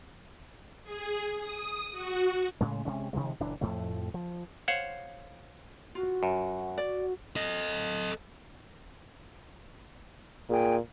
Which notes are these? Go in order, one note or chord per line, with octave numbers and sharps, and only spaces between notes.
G#4
D#6
F#4
A2 C#3 G#3
C3 G#3 C#4
C3 D#3 F3 G#3
F#1 A#2 E3 D4
F2 A2 F3 A3
F3
C5 C#5 F5 F#5
F4 F#4
F#2
D5
A4 D#5
A#2 G#4 G5